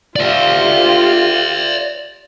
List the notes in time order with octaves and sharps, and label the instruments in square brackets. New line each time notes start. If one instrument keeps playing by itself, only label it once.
[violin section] F4 G4 [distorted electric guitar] D5 E5